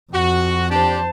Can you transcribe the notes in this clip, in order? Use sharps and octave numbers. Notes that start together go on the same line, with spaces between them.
F2 F#4
D4 G4 C5 A5